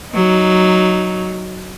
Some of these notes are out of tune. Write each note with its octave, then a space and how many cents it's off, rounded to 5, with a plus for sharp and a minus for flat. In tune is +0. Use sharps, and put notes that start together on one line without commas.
F#3 +0 D#4 +0